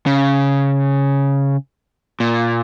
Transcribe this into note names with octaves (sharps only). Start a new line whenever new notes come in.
C#3
A#2